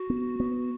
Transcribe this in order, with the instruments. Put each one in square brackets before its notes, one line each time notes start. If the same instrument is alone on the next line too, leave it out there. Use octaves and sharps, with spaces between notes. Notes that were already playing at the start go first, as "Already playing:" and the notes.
Already playing: [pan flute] F#4
[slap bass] B3
B3